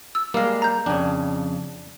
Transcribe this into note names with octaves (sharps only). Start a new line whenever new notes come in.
E6
G3 G#3 A#3 F5
A#5 G6
F2 C#3 D4